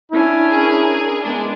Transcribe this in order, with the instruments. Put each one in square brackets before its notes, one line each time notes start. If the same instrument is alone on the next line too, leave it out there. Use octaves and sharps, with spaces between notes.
[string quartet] C#4 D4 G#5 [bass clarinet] E4
[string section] G#4 A#4
[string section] G#3 D4 [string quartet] B3